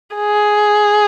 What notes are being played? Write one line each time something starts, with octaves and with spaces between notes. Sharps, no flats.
G#4